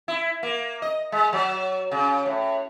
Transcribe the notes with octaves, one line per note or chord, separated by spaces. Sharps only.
E4
A#3
D#5
G#3
F#3
C#3
A2